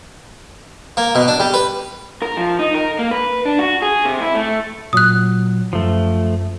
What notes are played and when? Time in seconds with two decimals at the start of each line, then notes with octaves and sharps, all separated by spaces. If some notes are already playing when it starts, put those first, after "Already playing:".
0.97 A#3
1.15 B2
1.28 D4
1.40 G3
1.54 B4
2.22 A#4
2.37 F3
2.59 D#4
2.74 A#4
2.99 A#3
3.11 B4
3.45 D4
3.59 F#4
3.82 G#4
4.05 C3
4.21 E4
4.34 A3
4.93 A#2 F#3 D#6 F#6
5.73 F#2 F3 A3